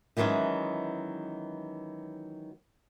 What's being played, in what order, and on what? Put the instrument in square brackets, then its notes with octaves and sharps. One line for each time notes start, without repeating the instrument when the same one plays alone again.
[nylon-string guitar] D#3 E3 F#3 G#3 C#4 F#4